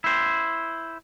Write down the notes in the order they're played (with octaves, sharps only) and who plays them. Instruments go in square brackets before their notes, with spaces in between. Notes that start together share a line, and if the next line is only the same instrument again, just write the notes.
[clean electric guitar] E4 C5